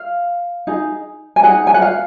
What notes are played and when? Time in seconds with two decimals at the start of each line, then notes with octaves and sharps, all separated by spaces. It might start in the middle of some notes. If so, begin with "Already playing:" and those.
Already playing: F5
0.67 D#4 G#4
1.36 G#5
1.43 D#4 G#4 F#5
1.67 G#5
1.74 F#5
1.82 F5